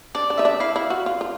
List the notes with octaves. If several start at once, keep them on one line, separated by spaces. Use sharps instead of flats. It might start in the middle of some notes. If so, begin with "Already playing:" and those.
D4 D5
D4
D#4 E5
D4
E4 F5
E4
F#4
F4
F4